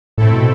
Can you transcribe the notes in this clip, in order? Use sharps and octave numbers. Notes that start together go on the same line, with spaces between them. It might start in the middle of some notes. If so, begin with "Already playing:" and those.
A2 A3 C4 E4 A4
B2